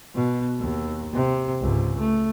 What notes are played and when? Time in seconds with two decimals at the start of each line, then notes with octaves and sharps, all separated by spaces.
0.15 B2
0.59 D#2
1.13 C3
1.61 C#2 G#2
1.99 A3